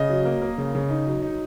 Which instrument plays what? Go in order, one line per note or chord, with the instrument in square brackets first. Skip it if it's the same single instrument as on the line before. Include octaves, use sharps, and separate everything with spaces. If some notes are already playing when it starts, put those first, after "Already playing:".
Already playing: [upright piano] C#3 D#5
F#3
A#3
A#3
C#3
C#3
D#4
F#3
D#4